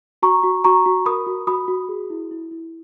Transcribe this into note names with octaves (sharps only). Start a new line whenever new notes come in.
F#4 A#5 C#6
F#4
F#4 A#5 C#6
F#4
A#4 B5 D#6
F#4
F#4 B5 D#6
F#4
G#4
E4
E4
E4